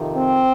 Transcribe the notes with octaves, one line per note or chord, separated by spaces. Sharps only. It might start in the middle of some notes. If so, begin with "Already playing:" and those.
Already playing: F2 C3 D#3
C4